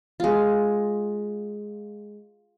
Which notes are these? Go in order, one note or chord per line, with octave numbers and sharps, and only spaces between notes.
G#3 F4